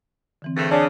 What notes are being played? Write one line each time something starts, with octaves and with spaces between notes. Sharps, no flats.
D3 E3 C4
G2 A3 G#4 C5
C#3 D4 C#5 G#5